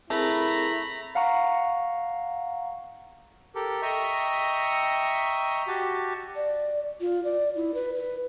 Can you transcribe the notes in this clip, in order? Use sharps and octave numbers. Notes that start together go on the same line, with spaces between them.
A3 C4 E4 G#4 A#4 A#5 B5
F5 F#5 A#5 C#6
G4 A4 A#4
D#5 E5 G5 A#5 C#6
F#4 G4 A5
D5
F4
D5
E4
B4
B4